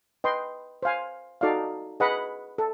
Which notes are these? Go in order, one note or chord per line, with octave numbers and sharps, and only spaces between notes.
B4 D#5 G5 C6
C5 F5 G#5
D#4 F#4 A4 D5 F5
G#4 B4 D#5 F#5 B5
A4